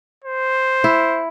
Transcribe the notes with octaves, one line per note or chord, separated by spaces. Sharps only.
C5
E4